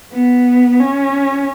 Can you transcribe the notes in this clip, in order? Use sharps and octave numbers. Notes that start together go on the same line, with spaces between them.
B3
C#4